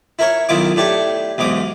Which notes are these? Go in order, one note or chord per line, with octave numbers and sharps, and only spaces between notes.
E4 A#4 C#5
B1 D#3 E4 F4 D6
A2 D4 G4 C#5
B1 E2 G#2 D6 D#6